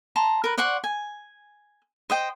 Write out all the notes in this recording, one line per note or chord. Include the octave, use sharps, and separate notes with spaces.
A5 A#5 C6
A#4 B4
C5 D5 F#5 C#6
G#5
C5 D#5 G5